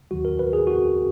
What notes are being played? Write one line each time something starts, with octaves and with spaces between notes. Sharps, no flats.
D#2 D#3 F#3 F#4
A#4
B4
G#4
F#4